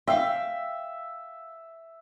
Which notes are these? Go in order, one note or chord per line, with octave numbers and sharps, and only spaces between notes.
E5 F5 G5